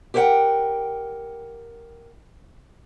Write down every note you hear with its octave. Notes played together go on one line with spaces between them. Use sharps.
G4 A#4 C5 E5 F#5 G5